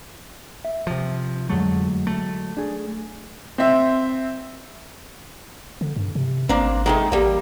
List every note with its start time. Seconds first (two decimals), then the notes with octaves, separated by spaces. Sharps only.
0.65 E5
0.87 C3 F3
1.49 F2 D3 F#3 G#3 A3
2.07 A3
2.57 D4 G#4
3.58 C4 E5
5.81 D3
5.96 G2
6.15 C3
6.49 G#1 A#3 C4 D4
6.86 D#3 G#3 A3
7.12 A1 G3 A#3